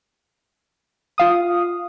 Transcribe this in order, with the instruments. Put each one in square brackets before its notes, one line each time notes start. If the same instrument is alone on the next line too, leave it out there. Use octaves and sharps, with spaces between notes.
[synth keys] F4 F5 D#6